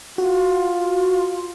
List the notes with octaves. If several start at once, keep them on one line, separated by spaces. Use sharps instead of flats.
F4 F#4